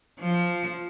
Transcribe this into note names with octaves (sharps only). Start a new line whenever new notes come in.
F3